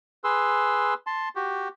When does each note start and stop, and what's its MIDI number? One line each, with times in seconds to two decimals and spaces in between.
0.24 0.94 68
0.24 0.94 71
0.24 0.94 84
0.24 0.94 88
1.07 1.29 81
1.07 1.29 84
1.36 1.68 66
1.36 1.68 67